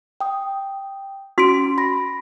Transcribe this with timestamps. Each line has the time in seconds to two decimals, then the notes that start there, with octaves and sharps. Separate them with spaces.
0.21 G5 D#6
1.38 C#4 F#4 C6 D7
1.78 B5 A#6